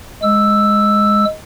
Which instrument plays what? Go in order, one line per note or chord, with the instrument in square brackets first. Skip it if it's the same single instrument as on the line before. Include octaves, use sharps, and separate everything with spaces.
[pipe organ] G#3 E6